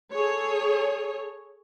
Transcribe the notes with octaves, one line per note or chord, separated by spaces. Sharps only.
G#4 A4 C#5